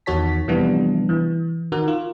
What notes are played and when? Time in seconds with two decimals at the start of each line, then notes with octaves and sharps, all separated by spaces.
0.06 E2 D#3 F#4 C#5 A5 B6
0.48 C3 E3 F3 G3 B3 D4
1.09 E3
1.72 D#3 F#4 A#4
1.88 F4